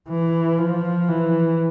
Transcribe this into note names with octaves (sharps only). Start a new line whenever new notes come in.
E3
F3
E3